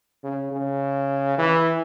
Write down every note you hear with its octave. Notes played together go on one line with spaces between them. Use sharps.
C#3
C#3
E3